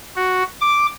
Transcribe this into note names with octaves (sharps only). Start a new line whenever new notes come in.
F#4
D6